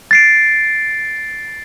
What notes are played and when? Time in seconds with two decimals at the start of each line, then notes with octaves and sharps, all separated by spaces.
0.11 A6 C7 D7